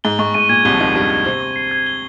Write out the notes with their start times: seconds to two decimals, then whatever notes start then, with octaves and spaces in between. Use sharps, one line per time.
0.04 G#2 G7
0.19 G#2 C#6
0.34 G#2 D#7
0.49 A#2 G#6
0.65 C2 C3 G7
0.74 F3
0.80 D#2 D#3 C#6
0.96 G2 G3 D#7
1.10 G#6
1.25 C3 C4 G7
1.40 C#6
1.56 C7
1.71 G#6
1.87 G7